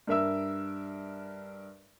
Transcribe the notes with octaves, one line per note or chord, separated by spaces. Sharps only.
G2 A#4 E5 E6